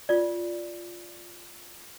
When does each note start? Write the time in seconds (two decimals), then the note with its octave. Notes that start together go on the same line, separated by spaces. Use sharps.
0.09 F4 D5